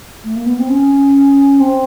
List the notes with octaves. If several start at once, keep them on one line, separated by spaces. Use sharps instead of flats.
A3
A#3
B3
C4
C#4
C4